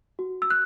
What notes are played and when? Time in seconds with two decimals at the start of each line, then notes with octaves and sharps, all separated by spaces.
0.19 F#4
0.42 E6
0.50 F#6